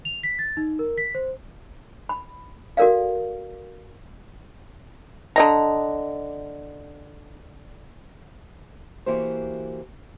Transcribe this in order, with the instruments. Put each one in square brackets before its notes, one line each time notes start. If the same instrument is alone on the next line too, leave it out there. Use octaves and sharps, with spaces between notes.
[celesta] F7
B6
A6
D#4
A#4
B6
C5
[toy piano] B5
F#4 A4 A#4 D5 F5
[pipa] D3 D#5 A#5
[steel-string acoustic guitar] E3 A#3 F#4 G4 C5